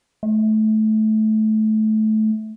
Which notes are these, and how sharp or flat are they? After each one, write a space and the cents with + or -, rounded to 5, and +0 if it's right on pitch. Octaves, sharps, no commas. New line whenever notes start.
A3 -20